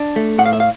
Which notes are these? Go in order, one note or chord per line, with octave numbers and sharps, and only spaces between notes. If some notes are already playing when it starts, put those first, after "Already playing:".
Already playing: D4
A3
A2 F#5
F5
E5
F5